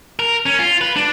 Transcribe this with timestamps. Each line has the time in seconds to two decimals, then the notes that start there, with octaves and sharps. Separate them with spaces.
0.19 A#4
0.46 C#4
0.59 F4
0.81 B4
0.96 D4